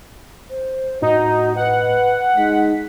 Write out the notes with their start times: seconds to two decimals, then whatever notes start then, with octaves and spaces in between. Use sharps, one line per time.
0.50 C5
1.02 A2 D#4 F#4 D#5
1.57 B4 F#5
2.37 G#3 D#4 B6